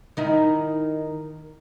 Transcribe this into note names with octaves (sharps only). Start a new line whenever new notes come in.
D#3 D#4 E4